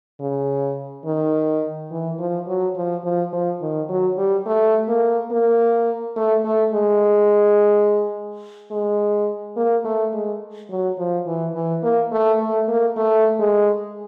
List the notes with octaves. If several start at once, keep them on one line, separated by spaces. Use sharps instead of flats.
C#3
D#3
E3
F3
F#3
F3
F3
F3
D#3
F#3
G3
A3
A#3
A#3
A3
A3
G#3
G#3
A#3
A3
G#3
F#3
F3
E3
E3
A#3
A3
A3
A#3
A3
G#3